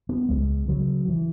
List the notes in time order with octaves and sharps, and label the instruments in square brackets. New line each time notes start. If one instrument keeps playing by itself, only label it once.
[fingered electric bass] B3
C#2 G#3
C#3 F#3
E3